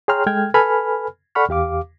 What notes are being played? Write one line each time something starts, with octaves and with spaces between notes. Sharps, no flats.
G#4 C#5 G5 A#5 C6 F6
G#3 A4 G5 F6 G#6
A4 B4 G#5 B5 F6
A4 D5 F#5 B5 C#6 F6
E2 G4 F5 D6